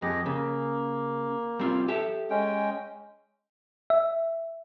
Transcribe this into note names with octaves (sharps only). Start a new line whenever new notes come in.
F2 G4 G#4 D#5
C#3 A#3
G3 C4 F4
G4 A4 E5
G#3 C#4 G5
E5